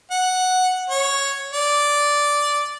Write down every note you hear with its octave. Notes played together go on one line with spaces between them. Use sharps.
F#5
C#5
D5